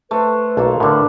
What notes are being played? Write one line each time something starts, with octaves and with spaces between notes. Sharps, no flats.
A3 B4 C5
B1 A#3 F4 A4
A2 D3 D4 A#4 B4